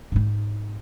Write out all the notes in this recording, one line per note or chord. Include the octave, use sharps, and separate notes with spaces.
G#2 D#4